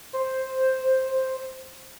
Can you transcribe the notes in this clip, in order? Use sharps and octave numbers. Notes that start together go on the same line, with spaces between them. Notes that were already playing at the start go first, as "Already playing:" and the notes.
C5